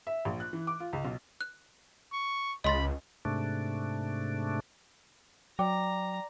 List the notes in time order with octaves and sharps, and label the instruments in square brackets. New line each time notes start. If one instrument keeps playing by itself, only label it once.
[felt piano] E5
A#1
F#6
E3
D6
F4
C#2
B1
[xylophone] F#6
[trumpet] C#6
[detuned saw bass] C#2 [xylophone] D#5 C6 A6 [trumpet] B5
[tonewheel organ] G#2 C3 A3 D4
[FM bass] F#3 [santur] D5 [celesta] G5 [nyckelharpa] A#5